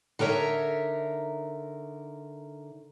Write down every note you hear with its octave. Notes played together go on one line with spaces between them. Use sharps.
D3 D#4 A#4 C#5 E5